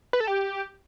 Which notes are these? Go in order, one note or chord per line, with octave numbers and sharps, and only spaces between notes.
B4
A4
G4